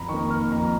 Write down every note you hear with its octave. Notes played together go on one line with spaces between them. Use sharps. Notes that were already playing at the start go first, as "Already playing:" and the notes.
Already playing: F2 A#5 B5
D#3 C#6
A#3
F6
F2 A#5